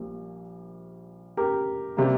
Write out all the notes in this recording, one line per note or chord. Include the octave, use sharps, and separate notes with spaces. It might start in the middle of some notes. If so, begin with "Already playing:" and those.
Already playing: A#1 A#2 G3
G4 A#4
C3 G3 A#3